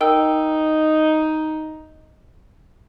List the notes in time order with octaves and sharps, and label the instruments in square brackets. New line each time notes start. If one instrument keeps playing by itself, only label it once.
[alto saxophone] D#4 [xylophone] A#4 G5 E6